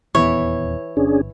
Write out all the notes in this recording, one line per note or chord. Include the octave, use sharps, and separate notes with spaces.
D#1 E2 E3 B3 E4 C#5
G1 C#4 D4 G#4